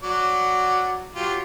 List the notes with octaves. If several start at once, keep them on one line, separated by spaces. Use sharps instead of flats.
F#3 F#4 D5
F#3 F4 G4